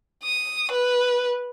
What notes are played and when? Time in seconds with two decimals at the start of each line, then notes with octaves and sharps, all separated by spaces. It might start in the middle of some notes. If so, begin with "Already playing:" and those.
0.24 D#6
0.71 B4